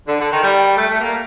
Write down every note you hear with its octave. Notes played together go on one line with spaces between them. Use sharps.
D3
D3
D#3
G3
A3
A3
A#3